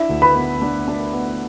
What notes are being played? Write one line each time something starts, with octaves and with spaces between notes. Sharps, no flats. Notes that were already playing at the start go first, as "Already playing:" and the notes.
Already playing: D4 E4 E5
D2
B4 B5
B3
D4
D4
B3